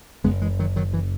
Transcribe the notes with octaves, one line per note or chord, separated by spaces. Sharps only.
F#1 F#2 C#3 G#3 B3
E3 G#3
D#3 F#3
D#3 F#3
E3